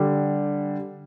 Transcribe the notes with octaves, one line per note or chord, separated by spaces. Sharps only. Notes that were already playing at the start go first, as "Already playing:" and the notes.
Already playing: D3 G3